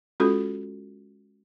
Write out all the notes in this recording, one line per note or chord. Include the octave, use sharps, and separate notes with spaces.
G#3 C#4 F4 F#4 A4